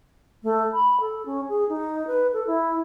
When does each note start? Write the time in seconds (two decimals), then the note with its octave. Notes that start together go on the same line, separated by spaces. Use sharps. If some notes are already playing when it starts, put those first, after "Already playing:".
0.43 A3
0.73 B5
1.00 A4
1.26 C#4
1.49 G#4
1.69 D#4
2.07 B4
2.33 A4
2.47 E4